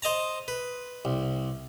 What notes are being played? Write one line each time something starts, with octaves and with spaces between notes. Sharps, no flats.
C5 D#5 A5 A#5
B4
C2